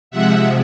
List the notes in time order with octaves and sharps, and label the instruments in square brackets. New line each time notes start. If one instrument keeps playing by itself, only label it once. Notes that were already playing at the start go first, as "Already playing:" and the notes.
[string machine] C3 F3 G#3 E5 F#5